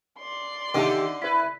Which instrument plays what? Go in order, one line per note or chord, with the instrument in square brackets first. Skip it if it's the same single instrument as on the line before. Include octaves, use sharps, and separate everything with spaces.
[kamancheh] D5 C6
[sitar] D#2 G4 A4 [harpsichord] D3 [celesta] D#4 D#5 E5
[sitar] E4 B4 [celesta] B6